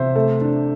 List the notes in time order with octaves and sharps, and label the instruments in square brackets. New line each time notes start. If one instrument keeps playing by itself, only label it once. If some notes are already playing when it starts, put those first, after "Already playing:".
Already playing: [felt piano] C3 [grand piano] C5 E5
[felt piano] A3
D4